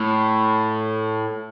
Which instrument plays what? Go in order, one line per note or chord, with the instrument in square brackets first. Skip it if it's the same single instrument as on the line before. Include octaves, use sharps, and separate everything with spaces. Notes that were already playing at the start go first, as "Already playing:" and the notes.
Already playing: [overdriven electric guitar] A2